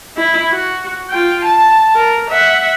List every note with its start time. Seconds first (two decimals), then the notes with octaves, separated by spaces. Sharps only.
0.17 E4
0.51 F#4
1.09 F4 G5
1.44 A5
1.94 A#4
2.30 E5 F#5